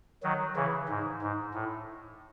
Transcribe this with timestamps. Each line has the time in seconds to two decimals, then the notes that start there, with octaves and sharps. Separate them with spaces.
0.23 D#3 F#3
0.56 C#3 E3
0.89 G#2
1.22 G#2
1.54 A2